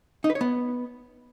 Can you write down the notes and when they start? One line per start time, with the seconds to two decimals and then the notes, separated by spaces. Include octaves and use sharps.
0.24 D#4
0.30 B4
0.35 C#5
0.41 B3